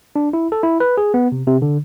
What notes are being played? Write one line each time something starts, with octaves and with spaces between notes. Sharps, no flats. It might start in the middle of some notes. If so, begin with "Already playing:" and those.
D4
E4
A4
E4
B4
G#4
B3
C3
C3
D3